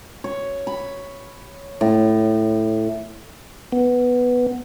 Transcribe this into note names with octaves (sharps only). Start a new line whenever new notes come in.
C#5
B5
A2
B3